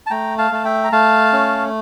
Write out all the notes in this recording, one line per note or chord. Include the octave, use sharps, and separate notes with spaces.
A5
A3 G5 A#5
F5 A5
A3 A5
E5 G5
A#5
A3 F5 A5
C#4